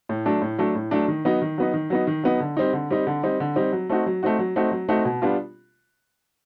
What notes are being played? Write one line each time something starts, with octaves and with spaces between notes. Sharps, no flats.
A2
F#3 A3 D4
A2
F#3 A3 D4
A2
F#3 A3 D4
D#3
F#3 B3 D#4
D#3
F#3 B3 D#4
D#3
F#3 B3 D#4
D#3
F#3 B3 D#4
D3
G3 C4 D#4
D3
G3 C4 D#4
D3
G3 C4 D#4
D3
G3 C4 D#4
F#3
A3 C4 D#4 F#4
F#3
A3 C4 D#4 F#4
F#3
A3 C4 D#4 F#4
F#3
A3 C4 D#4 F#4
B2
G3 B3 D4 F4